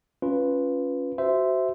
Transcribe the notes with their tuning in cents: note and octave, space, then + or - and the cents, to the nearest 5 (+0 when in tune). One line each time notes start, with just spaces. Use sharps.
C#4 +0 F4 +0 B4 +0
F#4 +20 C5 -15 E5 +0